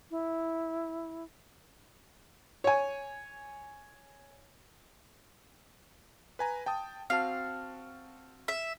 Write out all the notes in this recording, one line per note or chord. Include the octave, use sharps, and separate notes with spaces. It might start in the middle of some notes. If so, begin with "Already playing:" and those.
E4
C#5 G#5
B4 G#5 A#5
G5 A5 D#6
C4 F#4 F5 A5
E5